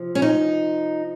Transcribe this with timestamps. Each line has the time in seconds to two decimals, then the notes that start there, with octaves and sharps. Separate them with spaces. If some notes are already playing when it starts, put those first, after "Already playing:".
Already playing: C3 F3
0.15 C#4
0.22 D#4